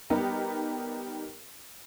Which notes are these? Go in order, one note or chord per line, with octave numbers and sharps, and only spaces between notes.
G3 B3 D#4 G4 A#4